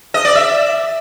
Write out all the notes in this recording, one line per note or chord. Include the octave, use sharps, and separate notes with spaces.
D#5
D5
E5